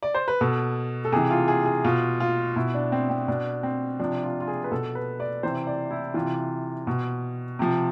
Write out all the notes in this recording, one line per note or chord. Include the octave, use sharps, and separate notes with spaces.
D5
C5
B4
B2 A4
A4
C3 E3 G#4
F4
G#4
G#4
B2 F4
F4
B2 E4
D4
C4
C4
B2 D4
C4
C3 F3 D4
F4
F4
G#4
B4
B2 A4
B4
D5
C3 E3 C5
D5
E4
C3 E3 F4
B2
C3 F3